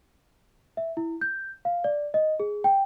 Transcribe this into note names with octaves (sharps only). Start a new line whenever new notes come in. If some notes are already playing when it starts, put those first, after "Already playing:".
E5
E4
G6
F5
D5
D#5
G#4
G5